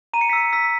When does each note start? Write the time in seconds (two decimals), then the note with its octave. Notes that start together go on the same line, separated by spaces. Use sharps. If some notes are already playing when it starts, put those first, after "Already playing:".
0.14 A#5 D#7
0.21 C#7
0.30 B6
0.33 E6 C#7
0.53 E6 B6